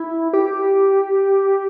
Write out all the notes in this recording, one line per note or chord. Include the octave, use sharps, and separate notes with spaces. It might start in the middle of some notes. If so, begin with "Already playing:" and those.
Already playing: E4
G4